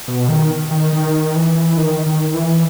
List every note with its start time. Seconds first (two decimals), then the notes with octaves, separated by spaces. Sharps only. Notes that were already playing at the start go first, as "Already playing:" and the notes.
0.08 B2
0.28 D#3
0.71 D#3
0.93 D#3
1.36 E3
1.77 D#3
2.06 D#3
2.34 E3